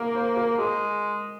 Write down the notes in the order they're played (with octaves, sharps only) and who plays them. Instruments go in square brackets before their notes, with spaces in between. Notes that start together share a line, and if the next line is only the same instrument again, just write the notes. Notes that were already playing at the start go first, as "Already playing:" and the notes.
Already playing: [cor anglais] A#3 [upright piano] A#4
[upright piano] C5
A#4
[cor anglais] G#3 [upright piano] G#4